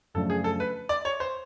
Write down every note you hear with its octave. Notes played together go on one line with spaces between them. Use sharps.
F#2 C#3 F3 A3 D4 A4
G#4
A4
B4
D5
C#5
C5